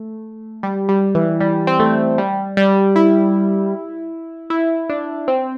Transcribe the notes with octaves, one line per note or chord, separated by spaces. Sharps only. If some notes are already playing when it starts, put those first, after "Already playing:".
Already playing: A3
G3
G3
E3
G3
C4
A3
G3
G3
E4
E4
D4
C4